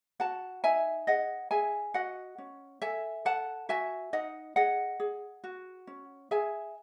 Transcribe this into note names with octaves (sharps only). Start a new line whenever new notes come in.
F#4 F#5 A5
D#4 E5 G#5
G#4 D#5 F#5
G#4 E5 G#5
F#4 D#5 F#5
C#4
A4 E5 G#5
A4 F#5 A5
F#4 E5 G#5
D#4 D#5 F#5
G#4 D#5 F#5
G#4
F#4
C#4
G#4 E5 G#5